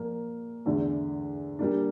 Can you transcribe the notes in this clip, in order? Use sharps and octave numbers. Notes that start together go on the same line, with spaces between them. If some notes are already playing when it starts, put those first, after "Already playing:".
Already playing: A#2 F3 A#3
E2 D3 A3
A#2 G3 A#3 D4